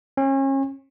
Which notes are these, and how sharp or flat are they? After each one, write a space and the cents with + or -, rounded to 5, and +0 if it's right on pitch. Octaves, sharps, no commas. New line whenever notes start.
C#4 -35